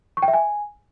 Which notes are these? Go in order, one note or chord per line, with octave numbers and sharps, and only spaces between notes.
C#6
G5
E5
G#5